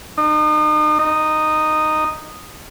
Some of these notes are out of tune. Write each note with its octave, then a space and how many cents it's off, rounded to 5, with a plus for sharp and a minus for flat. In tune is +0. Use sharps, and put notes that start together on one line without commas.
D#4 -40
D#4 -10